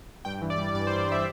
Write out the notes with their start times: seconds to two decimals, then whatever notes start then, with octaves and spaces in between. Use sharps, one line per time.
0.25 G2 G5
0.42 E3
0.50 D5
0.58 G3
0.74 G2 D5
0.87 C5
0.91 G3
0.99 D5
1.07 G3 E5